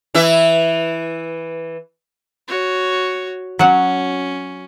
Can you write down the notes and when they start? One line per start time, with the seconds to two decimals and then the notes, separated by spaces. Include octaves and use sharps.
0.14 E3 E4 E5
2.48 F#4 C#5
3.59 F#3 C#4 F#5